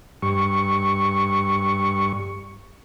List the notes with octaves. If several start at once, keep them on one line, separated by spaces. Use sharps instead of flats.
G2 C#6